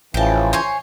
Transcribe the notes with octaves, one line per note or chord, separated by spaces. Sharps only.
A1 C#3 E3 F3 G5 A5
C5 C#5 G#5